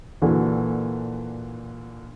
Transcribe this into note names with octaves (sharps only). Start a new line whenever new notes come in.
A#2 D3 E3 F#4 A4